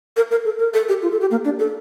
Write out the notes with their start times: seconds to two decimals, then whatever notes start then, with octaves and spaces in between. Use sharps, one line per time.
0.17 A#4
0.31 A#4
0.45 A4
0.59 A#4
0.74 A4
0.89 G4
1.02 F4
1.12 A4
1.21 G4
1.31 A#3
1.45 D4
1.59 A4